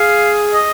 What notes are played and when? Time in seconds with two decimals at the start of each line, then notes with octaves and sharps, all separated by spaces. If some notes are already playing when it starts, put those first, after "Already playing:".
Already playing: G#4 F5
0.54 D#5